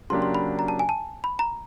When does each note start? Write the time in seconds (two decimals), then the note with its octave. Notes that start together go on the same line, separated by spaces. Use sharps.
0.10 C#3 F#3 A#3 D4 G4 C6
0.22 C6
0.35 B5
0.59 A#5
0.68 A5
0.79 G#5
0.89 A5
1.24 B5
1.39 A#5